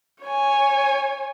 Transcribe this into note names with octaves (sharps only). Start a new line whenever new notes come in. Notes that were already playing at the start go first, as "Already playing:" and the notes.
C#5 G#5